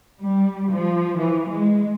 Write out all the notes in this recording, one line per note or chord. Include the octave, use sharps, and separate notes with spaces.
G3
F3
E3
G#3